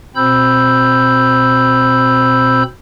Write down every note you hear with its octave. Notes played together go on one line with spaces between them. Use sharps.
B2 C4 C5 B5 E6 G6